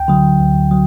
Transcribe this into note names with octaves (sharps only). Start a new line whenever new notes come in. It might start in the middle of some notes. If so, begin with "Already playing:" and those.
Already playing: D2 G5
D3 F#3
D2
F#3